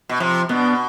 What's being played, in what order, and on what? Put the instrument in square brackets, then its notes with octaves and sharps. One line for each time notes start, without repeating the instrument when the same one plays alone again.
[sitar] B2
[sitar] C3 [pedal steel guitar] F3
[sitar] B2 [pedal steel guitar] B3 D4